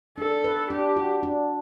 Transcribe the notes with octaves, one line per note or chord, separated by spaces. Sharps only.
D4 A4
B4
D4 G4
F#4
D4